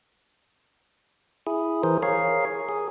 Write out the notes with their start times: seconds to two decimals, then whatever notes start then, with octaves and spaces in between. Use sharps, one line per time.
1.47 E4 G#4
1.83 E3 G#4 A#4 C5
2.03 G#4 A#4 C#5 F5
2.69 G#4